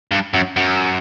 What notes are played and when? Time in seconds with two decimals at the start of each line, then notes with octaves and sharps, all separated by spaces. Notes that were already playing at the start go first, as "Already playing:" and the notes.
0.11 G2
0.34 F#2
0.57 F#2